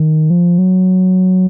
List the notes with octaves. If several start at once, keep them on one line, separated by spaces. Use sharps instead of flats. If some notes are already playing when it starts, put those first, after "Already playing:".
Already playing: D#3
F3
F#3